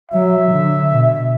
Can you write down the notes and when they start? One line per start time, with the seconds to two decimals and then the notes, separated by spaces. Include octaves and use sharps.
0.11 F#3 E5
0.51 D3
0.91 B2